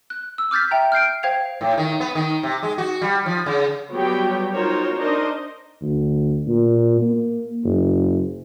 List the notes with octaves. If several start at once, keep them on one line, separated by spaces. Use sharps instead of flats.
F#6
E6
D6 F6 G6 A6 B6
E5 G5 A#5
F6 G6 C7 D7
C5 F5 G5 G#6 C7 F7
A2
D#3
B3
D#3
C3
G#3
F#4
G3
F3
C#3
F#3 G3 B3 G4 C#5 G5
D#4 F4 F#4 A#4 C5 C#5
D4 D#4 A#4 C5 D#5
D2
A#2
A#3
F#1